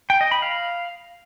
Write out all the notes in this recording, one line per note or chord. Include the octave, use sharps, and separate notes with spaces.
G5
D#5
B5
F5